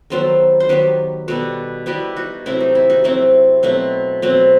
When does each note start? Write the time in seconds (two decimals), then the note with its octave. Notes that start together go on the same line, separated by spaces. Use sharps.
0.10 D#3 F#3 B3 A4 C5
0.60 C5
0.69 D#3 F#3 B3 G4 B4
1.28 B2 G3 B3 F#4 A4
1.86 B2 G3 B3 E4 G4
2.16 D#4 F#4
2.46 C3 F#3 A3 C4 E4
2.60 D#4
2.75 E4
2.90 D#4 F#4
3.04 C3 F#3 A3 C4 E4
3.63 B2 F#3 A3 C4
4.22 B2 F#3 A3 C4